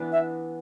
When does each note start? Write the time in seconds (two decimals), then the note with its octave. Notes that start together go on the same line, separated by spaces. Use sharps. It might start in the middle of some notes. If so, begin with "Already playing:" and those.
Already playing: E3 B3 D4
0.12 E5